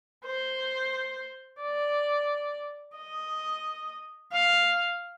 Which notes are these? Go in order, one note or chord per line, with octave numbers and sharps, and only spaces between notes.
C5
D5
D#5
F5